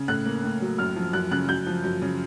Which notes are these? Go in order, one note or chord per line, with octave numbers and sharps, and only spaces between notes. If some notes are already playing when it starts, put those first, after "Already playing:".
Already playing: C#3
A2 F#6
A#3
A2
F#3
F#2 F6
F3
F#2 F#6
C#3 F#6
F#2 G6
F3
F#2
C#3